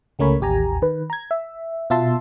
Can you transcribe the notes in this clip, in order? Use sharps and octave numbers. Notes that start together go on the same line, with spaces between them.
C#2 A3 C#4 A#4 C#5 B5
A1 D#2 G4 G#5 A#5
D#3 B4
A#5 G#6
E5
B2 F4 E5 A5 C6